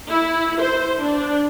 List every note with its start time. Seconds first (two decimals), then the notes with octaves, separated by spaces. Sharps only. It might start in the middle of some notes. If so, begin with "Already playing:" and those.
0.11 E4
0.62 C5
1.01 D4